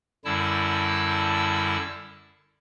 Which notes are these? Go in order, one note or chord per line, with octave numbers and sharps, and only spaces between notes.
F#2 D3 G3 E4 A5 E6